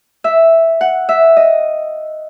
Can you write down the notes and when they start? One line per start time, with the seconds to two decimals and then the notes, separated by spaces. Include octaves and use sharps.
0.24 E5
0.81 F#5
1.09 E5
1.37 D#5